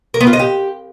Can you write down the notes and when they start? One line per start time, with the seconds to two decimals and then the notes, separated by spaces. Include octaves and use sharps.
0.14 A#4
0.20 B3
0.27 F4
0.33 D#5
0.39 G4